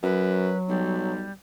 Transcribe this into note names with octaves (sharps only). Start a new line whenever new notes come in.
F#2 F#3 B4
B1 G3